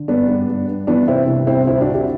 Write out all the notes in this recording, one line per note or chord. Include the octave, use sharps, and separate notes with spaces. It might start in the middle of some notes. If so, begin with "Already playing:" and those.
Already playing: D3
G2 B3 D4
G2
G2
G2
E3 B3 D4
C3 C4 E4
C2
C2 C4 E4
D2 C4 E4
D4 F#4
D2
E4 G4